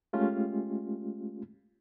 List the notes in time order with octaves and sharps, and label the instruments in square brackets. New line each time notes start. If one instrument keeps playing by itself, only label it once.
[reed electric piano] G#3 A3 C#4 F4 G4